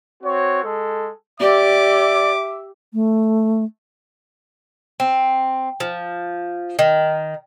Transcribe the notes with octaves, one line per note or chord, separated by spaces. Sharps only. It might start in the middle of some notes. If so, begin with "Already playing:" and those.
C4 F#4 C#5
G#3 A4
G4 D5 E5 D6
A3
C4
F3
D#3